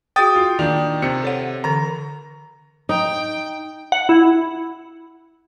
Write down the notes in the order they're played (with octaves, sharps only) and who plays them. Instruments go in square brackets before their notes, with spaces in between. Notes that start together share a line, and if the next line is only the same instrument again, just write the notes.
[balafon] F#4 G#4 F5 [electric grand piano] G5 D#6 A6
[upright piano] F4
A#2 D#3 D4
[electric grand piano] C3 [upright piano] C#7
[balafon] A4 C#5 F#5
[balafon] D3 E3 A4 [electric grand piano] A#5
[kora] D#4 [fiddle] G5
[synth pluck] F#5
E4